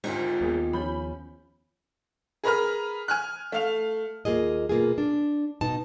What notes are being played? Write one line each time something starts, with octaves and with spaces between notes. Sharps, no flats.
G#1 D2 D#4 F4 G4
D#2 A#3 B3 G#4
F3 C#4 B5 G6
G#4 A#4 B4 A#5 F6
G#5 F6 F#6
A3 F5 F7
D#2 A#3 F4 G#4 D#5
B2 A#3 F4 G#4
D4
B2 D#4 A5